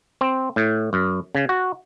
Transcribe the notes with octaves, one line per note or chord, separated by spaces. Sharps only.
C4
A2
F#2
C#3
F#4